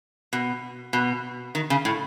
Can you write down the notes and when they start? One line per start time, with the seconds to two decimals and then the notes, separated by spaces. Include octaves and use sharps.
0.33 B2
0.93 B2
1.55 D#3
1.70 C#3
1.85 A2